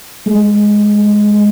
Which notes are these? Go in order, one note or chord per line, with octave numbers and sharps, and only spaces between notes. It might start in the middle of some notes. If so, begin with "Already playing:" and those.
G#3